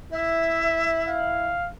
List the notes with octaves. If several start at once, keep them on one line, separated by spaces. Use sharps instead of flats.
E4 E5
F5